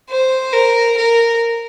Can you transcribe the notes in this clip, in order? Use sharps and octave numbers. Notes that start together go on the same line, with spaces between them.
C5
A#4
A#4